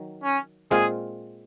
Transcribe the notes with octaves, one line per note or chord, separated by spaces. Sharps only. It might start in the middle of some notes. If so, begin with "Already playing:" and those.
Already playing: D#3 F#3
C#4
A#2 G#3 C4 F4 G#4